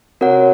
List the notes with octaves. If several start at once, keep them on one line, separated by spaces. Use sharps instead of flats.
C3 C4 F#4 A#4 C#5 F#5